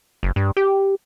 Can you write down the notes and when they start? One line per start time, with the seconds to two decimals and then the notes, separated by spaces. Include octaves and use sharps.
0.23 F#1
0.36 G2
0.57 G4